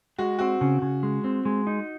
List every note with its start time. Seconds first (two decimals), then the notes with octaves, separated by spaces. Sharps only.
0.19 G#3 F#4
0.39 C4 F#4
0.61 C#3
0.82 C#3
1.03 G#3
1.24 C4
1.45 G#3
1.67 D#4